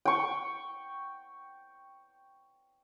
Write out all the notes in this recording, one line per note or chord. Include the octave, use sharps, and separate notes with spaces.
G5 C#6